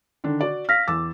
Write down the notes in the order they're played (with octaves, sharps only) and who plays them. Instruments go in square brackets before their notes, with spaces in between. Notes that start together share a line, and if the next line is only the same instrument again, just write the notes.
[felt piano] D3 D#3 D4
F#4 D5
[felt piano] F5 [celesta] F6 A#6 B6
[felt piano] E2 E6 A6 [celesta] D6